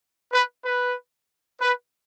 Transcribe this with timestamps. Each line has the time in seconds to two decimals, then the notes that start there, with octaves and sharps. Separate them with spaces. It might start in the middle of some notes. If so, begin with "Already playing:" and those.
0.32 B4
0.64 B4
1.61 B4